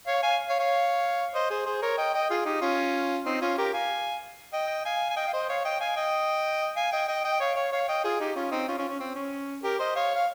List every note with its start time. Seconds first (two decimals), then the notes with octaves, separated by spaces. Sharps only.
0.06 C#5 F5
0.23 F5 G#5
0.49 C#5 F5
0.59 C#5 F5
1.34 C5 D#5
1.50 G#4 C5
1.66 G#4 C5
1.82 A#4 C#5
1.98 D#5 G5
2.14 D#5 G5
2.30 F4 G#4
2.45 D#4 G4
2.61 C#4 F4
3.26 C4 D#4
3.41 C#4 F4
3.58 G4 A#4
3.73 F5 G#5
4.53 D#5 G5
4.85 F5 G#5
5.10 G#5
5.16 D#5 G5
5.28 F5
5.33 C5 D#5
5.49 C#5 F5
5.64 D#5 G5
5.80 F5 G#5
5.96 D#5 G5
6.76 F5 G#5
6.92 D#5 G5
7.08 D#5 G5
7.24 D#5 G5
7.40 C#5 F5
7.56 C#5 F5
7.72 C#5 F5
7.88 D#5 G5
8.04 F4 G#4
8.20 D#4 G4
8.36 C#4 F4
8.51 C4 D#4
8.68 C#4 F4
8.78 C#4 F4
8.89 C#4
9.00 C4
9.15 C#4
9.64 G4 A#4
9.79 C5 D#5
9.95 C#5 F5
10.16 F5